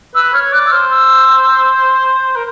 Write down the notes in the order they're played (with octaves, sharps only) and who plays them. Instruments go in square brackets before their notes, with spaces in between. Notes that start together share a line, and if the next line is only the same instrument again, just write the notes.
[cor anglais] B4 [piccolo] E6
[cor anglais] C#5 [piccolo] F6
[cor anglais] D5 [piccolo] F#6
[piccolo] E6
[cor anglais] C5 [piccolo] F6
[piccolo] E6
[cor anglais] A#4